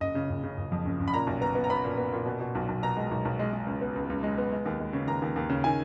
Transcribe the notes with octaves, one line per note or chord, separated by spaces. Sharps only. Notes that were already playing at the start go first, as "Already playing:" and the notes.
F#1 D#5
C#3
F#1
C#3
F#1
F2
F#1
F#1
B5
A#2 A#5
B1
B3 A#5
B3
A#5
B3 B5
A#2
B3
A#2
B2
B2
B1
B1
B2 A#5
G#3
B1
B1
G#3
G#3
C#2
B3
C#2
C#2
G#3
B3
G#3
D#2
G#3
C#3
D#2 A#5
D#2
D#2
C#3
D#3 G#5